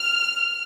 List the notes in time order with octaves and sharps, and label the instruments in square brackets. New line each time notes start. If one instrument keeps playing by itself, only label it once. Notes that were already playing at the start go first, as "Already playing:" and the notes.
Already playing: [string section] F6